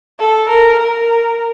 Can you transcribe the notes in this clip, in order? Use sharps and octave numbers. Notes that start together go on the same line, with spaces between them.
A4
A#4
A#4